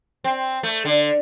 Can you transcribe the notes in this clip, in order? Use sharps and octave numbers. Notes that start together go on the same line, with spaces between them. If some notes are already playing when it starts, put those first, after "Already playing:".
C4
A3
D3